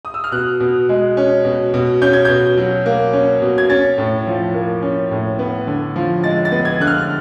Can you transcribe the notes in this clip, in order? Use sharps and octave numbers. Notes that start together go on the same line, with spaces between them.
D#6
E6
F6
B2 F#6
B2
G#3
C#4
B2
B2
C#4 G6
G#6
B2 G6
F#3
A#3
C#4
B2
G#6
C#4 A6
A2
F3
A#3
C#4
A2
B3
D3
F3
G#3 A6
A6
B3
G#6
D3 F#6
F6